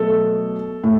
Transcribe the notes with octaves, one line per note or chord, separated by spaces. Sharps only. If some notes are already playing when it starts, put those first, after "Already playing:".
Already playing: B2 F#3 A3 A4
A2